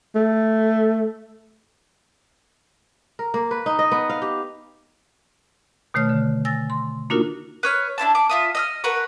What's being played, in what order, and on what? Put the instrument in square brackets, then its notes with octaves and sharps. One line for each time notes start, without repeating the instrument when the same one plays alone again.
[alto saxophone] A3
[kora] A#4
A#3
B4
D#4
D#5
B3
F5
G4
[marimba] B2 D#3 A3 C#5 F6
D3
G#5 E6 A6 A#6
C6
A#3 D4 D#4 F4 F#4 A#4
[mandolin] B4 C#5 F6
D4 E4 C5 A5
D6
F4 E5 D#6
D#5 E6 F6
F#4 A#4 B4 C#6